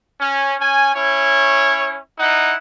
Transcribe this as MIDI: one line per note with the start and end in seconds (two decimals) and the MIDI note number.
0.20 0.54 61
0.59 0.91 61
0.59 0.91 80
0.95 1.99 61
0.95 1.99 64
0.95 1.99 73
2.19 2.54 63
2.19 2.54 64
2.19 2.54 78